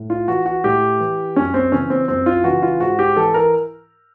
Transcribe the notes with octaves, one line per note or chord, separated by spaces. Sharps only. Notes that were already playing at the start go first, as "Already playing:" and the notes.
Already playing: A2
F4
E3 F#4
F#4
A2 G4
E3
F#2 C#4
C4
C#3 E3 C#4
C4
F#2 C4
F4
C#3 E3 F#4
F4
G#2 F#4
G4
E3 A4
A#4